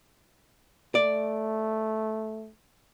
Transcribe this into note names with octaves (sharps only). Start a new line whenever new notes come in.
A3 D5